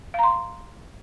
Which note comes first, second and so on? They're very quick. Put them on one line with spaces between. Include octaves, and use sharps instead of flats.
F5 A#5 C6